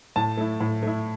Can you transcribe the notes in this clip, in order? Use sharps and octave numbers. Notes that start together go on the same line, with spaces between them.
A2 A5
A3 E4
A2
A3 E4